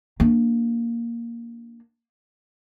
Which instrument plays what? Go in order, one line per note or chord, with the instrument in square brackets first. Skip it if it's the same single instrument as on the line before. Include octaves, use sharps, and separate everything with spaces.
[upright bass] A#3 D4